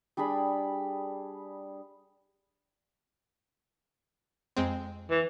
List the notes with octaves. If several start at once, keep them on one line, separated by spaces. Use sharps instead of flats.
G3 D4 G#4 B5
F2 G#3 C4
E3